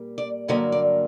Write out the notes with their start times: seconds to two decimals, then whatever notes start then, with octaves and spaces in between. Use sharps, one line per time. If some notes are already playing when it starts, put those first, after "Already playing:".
Already playing: A#2 G3 A#3
0.18 D5
0.48 G2 D3 F#3 A#3 D#5
0.72 D5